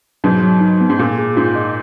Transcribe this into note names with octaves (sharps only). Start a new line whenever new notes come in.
G#2 B2 F#3
F#3
D#4
B3
G#2
A#2 G#4
G#4
G#2 F4
D#5